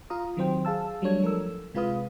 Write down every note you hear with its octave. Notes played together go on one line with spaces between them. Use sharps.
F4 F5 A#5 D#6
D#3 F#3 C4 C5 G5
G#4 F5 A5 E6
F#3 G3 A3 D4 C#5 G#6
F3 A4 A#4 E6
C3 G#3 F4 B4 F5 D#6